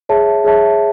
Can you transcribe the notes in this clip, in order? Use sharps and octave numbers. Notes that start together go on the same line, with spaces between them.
G#4 C#5 E5 A5
G#4 C#5 E5 A5